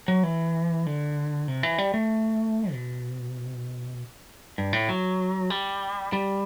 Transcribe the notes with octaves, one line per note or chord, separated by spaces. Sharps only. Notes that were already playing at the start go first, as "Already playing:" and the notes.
F#3
E3
D3
C3
E3
G3
A3
B2
G2
A2
F#3
G3
G3